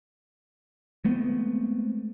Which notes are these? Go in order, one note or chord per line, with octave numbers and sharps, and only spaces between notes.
G#3 A3 B3 C4